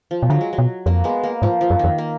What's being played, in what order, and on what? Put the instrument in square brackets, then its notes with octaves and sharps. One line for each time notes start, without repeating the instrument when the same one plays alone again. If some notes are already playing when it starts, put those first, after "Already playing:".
[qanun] F3
[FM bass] B2
[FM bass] D3 [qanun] F#3
[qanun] G#3
F#3
[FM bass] B2
[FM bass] F2 [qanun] A#3
[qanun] G#3 B3
A#3
[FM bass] G#2 [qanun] F3
[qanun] F3
[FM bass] F#2
[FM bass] F2 [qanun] D#3
[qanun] A#3